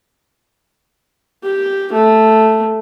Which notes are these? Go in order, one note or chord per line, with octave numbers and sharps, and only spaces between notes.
G4
A3